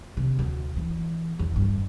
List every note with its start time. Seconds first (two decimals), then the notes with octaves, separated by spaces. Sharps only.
0.17 C3
0.39 D2
0.76 E3
1.39 E2
1.56 G2